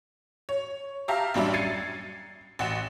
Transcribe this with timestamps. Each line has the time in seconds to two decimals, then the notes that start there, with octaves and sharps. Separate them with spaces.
0.49 C#5
1.08 G4 E5 F5 A5 A#5
1.34 A1 F#2 G3 D4 E5
1.53 G#6 A6 C7 C#7 D#7
2.59 A1 F#5 E7